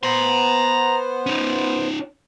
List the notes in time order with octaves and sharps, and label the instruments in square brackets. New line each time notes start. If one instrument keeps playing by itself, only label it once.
[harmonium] B3 C5 [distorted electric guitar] A#5 C6
[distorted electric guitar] C#4 D#4